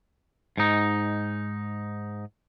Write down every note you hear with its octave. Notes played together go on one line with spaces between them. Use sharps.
G#2 D#4